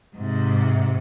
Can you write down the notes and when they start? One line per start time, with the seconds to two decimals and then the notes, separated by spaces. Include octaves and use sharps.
0.15 G#2 C3